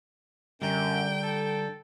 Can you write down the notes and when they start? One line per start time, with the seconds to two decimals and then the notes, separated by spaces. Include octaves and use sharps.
0.62 F#2 D3 G3 G5 A#5
1.23 A4